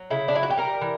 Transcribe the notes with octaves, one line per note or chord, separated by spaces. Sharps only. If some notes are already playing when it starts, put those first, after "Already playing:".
Already playing: F#3
C#3 E4
D4
F#3 E4
F#4
G4
G3 A#4
E3